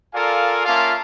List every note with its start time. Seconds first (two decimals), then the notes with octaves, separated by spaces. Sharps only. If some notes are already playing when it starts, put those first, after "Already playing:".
0.14 F4 A4 A#4 D5 F5 G#5
0.66 A#3 C#4 F4 E5 F5 A5